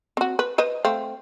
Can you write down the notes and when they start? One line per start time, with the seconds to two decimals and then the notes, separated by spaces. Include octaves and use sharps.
0.17 C4 F#4
0.39 B4
0.58 B4 C5 D#5
0.85 A3 C4 F5